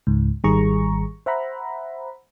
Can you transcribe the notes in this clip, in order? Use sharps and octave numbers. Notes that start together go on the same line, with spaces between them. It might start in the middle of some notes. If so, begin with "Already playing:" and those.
C#2 G#2
G#1 D#3 G3 G#4 A#5 C#6
C5 E5 F#5 A#5 B5